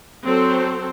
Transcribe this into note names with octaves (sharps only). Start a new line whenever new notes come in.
F#3 C4 A4 C5